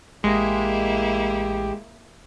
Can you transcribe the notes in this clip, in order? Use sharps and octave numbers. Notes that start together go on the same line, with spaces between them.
A1 G#3 A#3 E4 G4